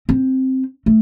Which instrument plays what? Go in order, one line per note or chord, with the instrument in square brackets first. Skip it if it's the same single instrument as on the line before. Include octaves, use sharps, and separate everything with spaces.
[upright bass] C4
A3